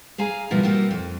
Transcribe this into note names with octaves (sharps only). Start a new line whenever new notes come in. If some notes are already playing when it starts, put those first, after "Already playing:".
G#4 F5 G#5 A#5
B2 F3 G3 A#3 B3 E4
G3 A#3 C4 F#4 G4
F2